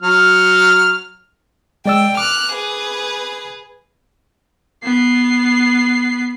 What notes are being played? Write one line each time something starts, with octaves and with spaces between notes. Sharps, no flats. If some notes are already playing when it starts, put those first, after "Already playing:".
F#3 F6
G#3 D5 G5 E6
D6 F6 F#6
G#4 B4
B3 C7